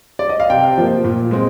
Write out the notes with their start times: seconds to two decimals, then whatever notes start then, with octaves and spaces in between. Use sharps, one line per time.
0.19 D5
0.29 D#5
0.40 F5
0.50 C3 G5
0.78 F3 A#3
1.04 A#2
1.31 G#3 C4